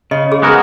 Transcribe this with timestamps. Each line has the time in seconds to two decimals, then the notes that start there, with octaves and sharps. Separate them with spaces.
0.11 C#3 D#5
0.32 G#4
0.42 G#3 B3 F#4 A#4